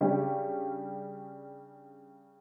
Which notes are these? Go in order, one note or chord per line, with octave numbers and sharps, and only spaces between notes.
C#3 G3 C#4 D4 G4